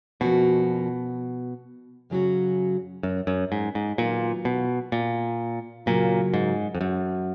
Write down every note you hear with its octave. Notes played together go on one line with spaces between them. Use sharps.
F2 B2 F3 A#3 C#4 F#4
F#2 C#3 F#3 C#4 F#4
F#2
F#2
G#2
G#2
A#2 D#3 F#3 B3 F4
B2
A#2
F#2 A#2 C#3 F#3 A#3 F4
G#2
F2
F#2